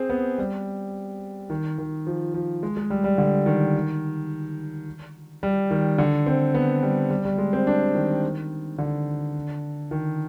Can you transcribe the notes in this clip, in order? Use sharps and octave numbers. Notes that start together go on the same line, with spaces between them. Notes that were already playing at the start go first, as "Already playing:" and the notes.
Already playing: C4 G#4
B3
G3
D#3
D#3
F3
F3
G#3
G#3
G3
G3
D3
D#3
G3
D#3
D3
C4
B3
G3
G3
G3
G#3
C4
D4
D#3
D3
D#3